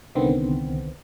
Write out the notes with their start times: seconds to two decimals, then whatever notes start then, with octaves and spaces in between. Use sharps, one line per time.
0.15 C2 D3 D#3 B3 C4